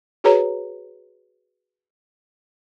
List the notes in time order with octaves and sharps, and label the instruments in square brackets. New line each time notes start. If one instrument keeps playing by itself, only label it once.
[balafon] F#4 G#4 B4 C#5 A#5